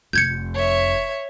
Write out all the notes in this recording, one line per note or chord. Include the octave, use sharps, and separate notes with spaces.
F1 G6 G#6 C#7
C#5 E5